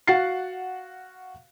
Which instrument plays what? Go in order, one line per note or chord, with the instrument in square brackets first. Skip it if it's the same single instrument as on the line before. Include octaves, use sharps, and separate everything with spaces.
[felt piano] F#4 F5 F#5 A6 C7